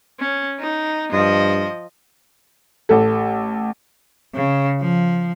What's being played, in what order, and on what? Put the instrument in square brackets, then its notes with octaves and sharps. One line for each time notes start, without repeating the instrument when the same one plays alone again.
[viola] C#4
D#4
[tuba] G2 [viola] F3 D#5
[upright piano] A1 A4
[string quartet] C#3
F3